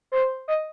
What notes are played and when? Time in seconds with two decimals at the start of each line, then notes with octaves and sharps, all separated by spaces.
0.12 C5
0.48 D#5